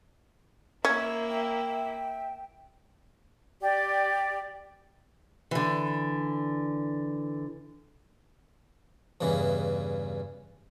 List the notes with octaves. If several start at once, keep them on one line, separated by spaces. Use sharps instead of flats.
A#3 C#4 E4 E5
G5
G4 D5
D3 E3
E2 G2 C#3 E3